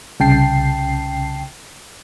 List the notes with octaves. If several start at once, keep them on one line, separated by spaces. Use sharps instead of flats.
C2 C#3 G5 A5 C7